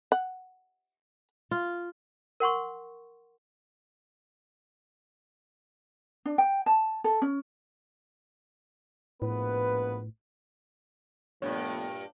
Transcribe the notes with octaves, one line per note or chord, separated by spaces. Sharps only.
F#5
F4
A#4 F#5 C6 C#6
D4
G5
A5
A4
C#4
A#1 A2 B3 B4
G2 A#2 F3 A3 B3 C#5